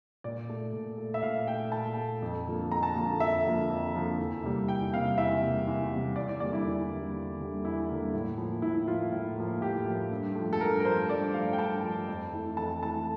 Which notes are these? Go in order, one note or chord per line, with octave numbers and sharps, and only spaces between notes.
A#2 D5
A3
A#2
A3
E5
A#2 F5
A3 G5
A#2 A5
A3
F2
D3 F3 A#3
F2 A#5
A5
D3 F3 A#3
F2 E5
D3 F3 A#3
F2
D3 F3 A#3
E2
C3 G3 A#3
E2 G5
C3 G3 A#3 F5
E2 E5
C3 G3 A#3
E2
C3 G3 A#3
E2 D5
D5
D3 G3 A#3 D5
E4
E2
D3 G3 A#3
E2
D3 G3 A#3
E2 E4
D3 G3 A#3
A2
F3 A#3
A2 E4
F3 A#3 F4
A2
F3 A#3
A2 G4
F3 A#3
G2
F3 A3
A4
G2 A#4
A#4
F3 A3 C5
G2 D5
F3 A3 F5
G5
G2 A5
F3 A3
F2
E3 A3
F2 A5
E3 A3 A5